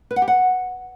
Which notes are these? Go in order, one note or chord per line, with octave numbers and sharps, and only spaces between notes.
B4
F#5
G4
F#5